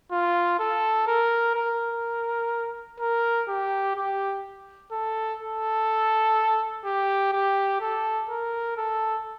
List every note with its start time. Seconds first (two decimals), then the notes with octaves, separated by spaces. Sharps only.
0.11 F4
0.59 A4
1.07 A#4
1.55 A#4
3.00 A#4
3.48 G4
3.96 G4
4.92 A4
5.40 A4
6.85 G4
7.33 G4
7.81 A4
8.29 A#4
8.77 A4